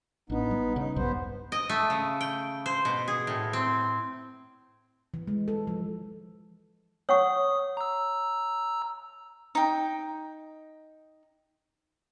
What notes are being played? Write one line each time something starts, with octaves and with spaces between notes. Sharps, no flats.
A1 B3 D4 D#4
G3
C#3 D#4
B1 E2 G2 B3 C5
D#5
A3
C#3
G5
C5
B2
G#4
A2
C4
E3
G#3
A4
F3
C#5 F#5 C#6 D#6
A#5 E6
D#4 G5